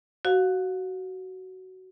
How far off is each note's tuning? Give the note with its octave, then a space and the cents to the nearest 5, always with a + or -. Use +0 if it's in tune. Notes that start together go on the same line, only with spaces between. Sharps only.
F#4 +15 F5 +40